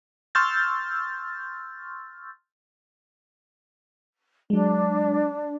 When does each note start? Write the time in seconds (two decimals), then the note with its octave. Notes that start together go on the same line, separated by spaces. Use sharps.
0.35 C6 C#6 E6 F6 G6 A6
4.50 F#3 G#3 D4